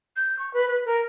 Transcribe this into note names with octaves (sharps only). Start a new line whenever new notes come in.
G6
C#6
B4
B4
A#4